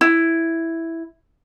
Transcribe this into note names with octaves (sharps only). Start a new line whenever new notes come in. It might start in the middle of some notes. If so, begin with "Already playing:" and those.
E4